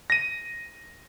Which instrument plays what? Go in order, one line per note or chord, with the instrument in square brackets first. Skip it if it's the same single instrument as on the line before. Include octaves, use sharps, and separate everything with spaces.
[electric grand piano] A#6 D#7